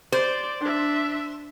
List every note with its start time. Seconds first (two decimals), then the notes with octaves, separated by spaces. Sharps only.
0.12 C5 D5
0.61 D4 E5